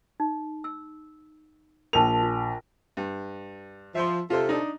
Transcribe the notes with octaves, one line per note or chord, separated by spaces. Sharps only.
D#4
E6
A#1 A#4 G5 A5 F7
F4
G2
F3 E5 C6
C3 F4 A4 C5
D4 D#4